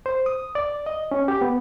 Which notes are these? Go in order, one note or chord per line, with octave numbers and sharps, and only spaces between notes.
C5
D#6
D5
D#5
C#4
G4
B3